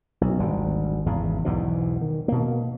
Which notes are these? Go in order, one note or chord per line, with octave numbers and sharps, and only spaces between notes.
B1
G#1 D2 G3
G#1 E2 C#3
B1 E2 G#2 B2
D#3
B2 A#3